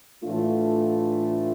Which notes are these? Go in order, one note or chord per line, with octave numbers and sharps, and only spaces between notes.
A2 E3 A3 D4 F4